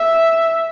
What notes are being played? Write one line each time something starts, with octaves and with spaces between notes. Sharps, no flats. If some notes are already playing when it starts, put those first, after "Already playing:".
Already playing: E5